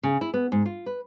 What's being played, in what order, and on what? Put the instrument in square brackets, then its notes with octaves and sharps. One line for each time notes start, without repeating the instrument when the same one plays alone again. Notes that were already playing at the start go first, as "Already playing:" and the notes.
[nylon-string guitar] C#3
E4
B3
G#2
F4
B4